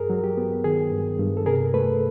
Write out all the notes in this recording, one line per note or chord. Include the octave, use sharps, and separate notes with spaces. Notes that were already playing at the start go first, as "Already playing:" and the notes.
Already playing: G2 G#4 A#4
F#3
G4
B3
D#3 G#4
G2
G2
A4
C3 G#4 A#4
A3 A4 B4